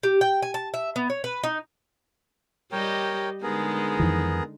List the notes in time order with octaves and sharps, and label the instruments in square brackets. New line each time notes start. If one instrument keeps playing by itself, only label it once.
[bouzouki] G4
G5
G#5
A5
E5
B3
C#5
B4
D#4
[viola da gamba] G3 G4 D#5 [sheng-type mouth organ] A#4 C#5 G5
[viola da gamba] D3 G#3 D#4 [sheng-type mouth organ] B3 G#4 A#4
[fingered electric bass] F2 D#3 E3